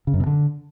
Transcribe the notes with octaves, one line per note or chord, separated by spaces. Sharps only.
C#3
F#2
B2
D3